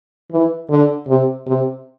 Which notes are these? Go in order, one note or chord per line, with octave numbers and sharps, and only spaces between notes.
E3
D3
C3
C3